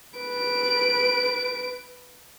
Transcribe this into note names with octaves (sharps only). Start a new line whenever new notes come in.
B4 D7